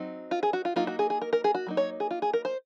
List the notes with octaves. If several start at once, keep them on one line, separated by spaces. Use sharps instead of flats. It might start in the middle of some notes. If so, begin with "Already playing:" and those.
Already playing: F#3 C4 D#4
F4
G#4
F#4
F4
F#3 A#3 D#4 F4
F#4
G#4
G#4
A#4
A#4
G#4
F#4
F#3 A#3 D#4
C#5
G#4
F4
G#4
A#4
C5